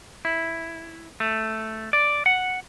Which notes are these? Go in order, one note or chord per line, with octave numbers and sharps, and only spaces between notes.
E4
A3
D5
F#5